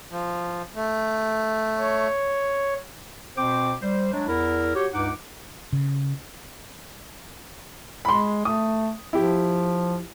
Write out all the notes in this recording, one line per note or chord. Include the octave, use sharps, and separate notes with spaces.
F3
A3
C#5
B2 C4 C5 G5 D6
G3 C5
F#3 G#3 D4
E2 E4 A#4
F#4 G4 C#5
C#2 G2 D#4 F#5 D6
C#3
G#3 B5 C6
A3 D#6
F3 E4 G4